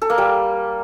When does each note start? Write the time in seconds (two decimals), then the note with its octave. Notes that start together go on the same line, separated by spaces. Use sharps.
0.02 A4
0.10 A#3
0.18 G3